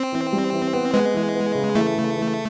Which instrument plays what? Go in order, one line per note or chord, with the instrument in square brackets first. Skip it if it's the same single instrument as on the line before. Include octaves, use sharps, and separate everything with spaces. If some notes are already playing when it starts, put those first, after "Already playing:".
Already playing: [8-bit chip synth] C4
[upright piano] E3
G3
E3
B3
[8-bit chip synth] G#3 [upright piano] B3
[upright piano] E3
B3
C#3
[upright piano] E3 [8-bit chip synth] A3
[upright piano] C#3
E3